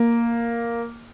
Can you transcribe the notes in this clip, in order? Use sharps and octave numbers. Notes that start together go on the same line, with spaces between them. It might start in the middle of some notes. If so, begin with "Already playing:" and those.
Already playing: A#3